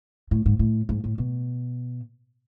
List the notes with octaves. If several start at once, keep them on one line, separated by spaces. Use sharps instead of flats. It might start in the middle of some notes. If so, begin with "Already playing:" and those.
A2
G#2
A2
G#2
A2
B2